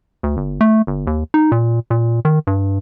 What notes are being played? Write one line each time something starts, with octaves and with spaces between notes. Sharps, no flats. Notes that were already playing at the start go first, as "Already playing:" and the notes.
D2
G1
A3
G1
D#2
D#4
A#2
A#2
D#3
G2